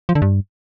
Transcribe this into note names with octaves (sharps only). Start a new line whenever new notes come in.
F3
D3
G2